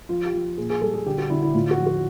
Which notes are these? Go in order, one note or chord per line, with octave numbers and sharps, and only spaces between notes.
F3 F4
G4
F3
A#2 G#4
G#4
G3 A4
G#4
D3 G4
F#4
D3 E4
E4
A2 F4
F#4
F3
F#4